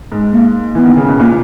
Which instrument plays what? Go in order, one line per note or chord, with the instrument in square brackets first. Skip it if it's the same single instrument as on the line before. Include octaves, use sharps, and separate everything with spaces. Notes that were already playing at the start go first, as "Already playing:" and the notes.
[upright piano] G#2
[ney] A#3
[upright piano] E3 [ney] B3
[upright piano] D#3
C#3
B2
[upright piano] A#2 [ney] A#3